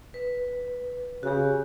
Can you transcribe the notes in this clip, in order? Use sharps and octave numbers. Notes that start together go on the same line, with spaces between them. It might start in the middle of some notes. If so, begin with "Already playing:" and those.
B4
C#3 F#4 G4